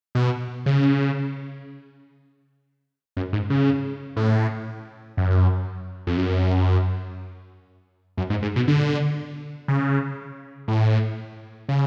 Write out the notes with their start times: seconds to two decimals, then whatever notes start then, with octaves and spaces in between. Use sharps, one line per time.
0.15 B2
0.66 C#3
3.17 F#2
3.33 G#2
3.50 C#3
4.17 A2
5.17 F#2
6.07 F2
6.17 F#2
8.18 F#2
8.30 G#2
8.42 G#2
8.56 B2
8.68 D3
9.68 C#3
10.68 A2
11.69 C#3